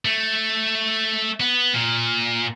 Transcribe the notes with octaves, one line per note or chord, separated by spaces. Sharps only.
A3
B3
A#2